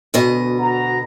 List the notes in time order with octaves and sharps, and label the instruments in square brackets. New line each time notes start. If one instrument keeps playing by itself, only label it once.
[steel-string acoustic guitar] D2 B2 D#5
[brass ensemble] F#4 A#5